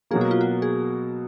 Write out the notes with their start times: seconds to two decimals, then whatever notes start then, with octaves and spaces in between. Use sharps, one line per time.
0.11 B2 F#3 A#3 G#4
0.21 F#4
0.31 F4
0.41 F#4
0.62 G#4